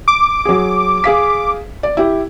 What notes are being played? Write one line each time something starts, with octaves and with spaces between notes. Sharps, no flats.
D6
F#3 G#4
G#4 F5 B6
D5
E4 G4